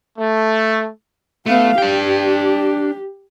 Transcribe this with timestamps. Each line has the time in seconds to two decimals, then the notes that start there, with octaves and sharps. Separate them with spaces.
0.18 A3
1.46 A3 B3 F5
1.78 D4 G4 G5